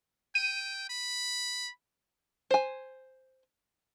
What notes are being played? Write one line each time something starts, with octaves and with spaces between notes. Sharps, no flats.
G5 D#7
B5
C5 G#5